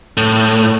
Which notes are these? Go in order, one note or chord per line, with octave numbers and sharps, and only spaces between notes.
A2